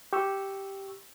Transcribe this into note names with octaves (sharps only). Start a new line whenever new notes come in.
G4 C#6 E6